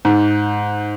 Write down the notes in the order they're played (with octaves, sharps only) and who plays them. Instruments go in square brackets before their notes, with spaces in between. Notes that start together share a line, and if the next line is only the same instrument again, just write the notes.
[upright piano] G#2